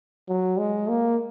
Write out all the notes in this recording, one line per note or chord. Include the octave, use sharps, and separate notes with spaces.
F#3
G#3
A#3